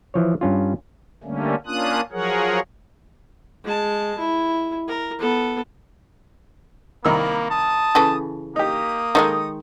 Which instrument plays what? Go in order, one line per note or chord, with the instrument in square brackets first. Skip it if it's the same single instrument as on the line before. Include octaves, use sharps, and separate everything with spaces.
[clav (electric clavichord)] E3 F3 C#5
G2 C#4 F4
[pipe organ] D3 G3 A3 A#3 C#4
A#3 C#4 D4 F4 D#6 F#6
F3 F#3 G#4 A#4 C#5 F#5
[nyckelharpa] G#3 A5
E4
A#4
B3 A4
[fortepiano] C2 D#3 E6 [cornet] A#3 [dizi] B5
[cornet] A5 [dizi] D#6
[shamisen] C#3 E3 A4
[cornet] A#3 [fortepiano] D#4 G4 [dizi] D#6
[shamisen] D#3 G3 G#3 [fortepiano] D#4 A4